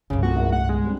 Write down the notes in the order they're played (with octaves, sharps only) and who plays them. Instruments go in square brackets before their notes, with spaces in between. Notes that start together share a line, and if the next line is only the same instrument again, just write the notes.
[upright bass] C2 G2 [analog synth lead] C#3
[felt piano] F3 A3 C4 [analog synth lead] F#4
[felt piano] A1 G#3 A#4
[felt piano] A2 [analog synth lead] F#5
[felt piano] G1 [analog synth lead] G#3
[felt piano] G3 C4 D4